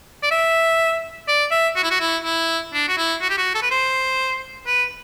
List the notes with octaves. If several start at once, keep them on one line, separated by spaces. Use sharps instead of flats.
D5
E5
D5
E5
F#4
E4
F#4
E4
E4
D4
F#4
E4
F#4
G4
F#4
A4
B4
C5
B4